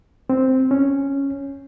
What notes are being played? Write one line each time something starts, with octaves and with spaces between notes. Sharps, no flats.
C4
C#4